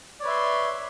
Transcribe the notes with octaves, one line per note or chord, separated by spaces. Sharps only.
B4 C#5 D5 E5 C6